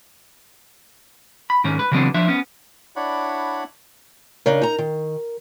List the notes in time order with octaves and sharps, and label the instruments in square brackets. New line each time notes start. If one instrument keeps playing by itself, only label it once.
[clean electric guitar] B5
G#2 D#3 C#4
B4
C#3 E3 F#3 B3 C4 D4
F3 D4 E5
B3 C#4
[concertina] D4 E4 C#5 D5 F#5 B5
[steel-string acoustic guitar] C#3 D4 D#4 [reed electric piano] A#4
[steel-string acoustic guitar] D#4 A#5
D#3